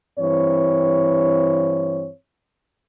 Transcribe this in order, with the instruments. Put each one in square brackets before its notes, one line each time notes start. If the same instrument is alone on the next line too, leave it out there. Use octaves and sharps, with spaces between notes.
[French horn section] G2 E3 C4 C#5